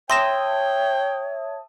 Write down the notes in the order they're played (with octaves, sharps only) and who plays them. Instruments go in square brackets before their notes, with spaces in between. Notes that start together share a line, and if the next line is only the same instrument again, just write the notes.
[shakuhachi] C#5 [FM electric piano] E5 A5 D#6 [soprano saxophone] G5 [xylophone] C6 A#6 E7